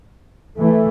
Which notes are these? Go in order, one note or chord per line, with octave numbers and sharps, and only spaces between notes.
E3 A3